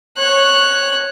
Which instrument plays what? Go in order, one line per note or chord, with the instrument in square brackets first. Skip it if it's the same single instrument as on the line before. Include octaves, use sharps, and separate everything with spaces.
[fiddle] C#5 F#6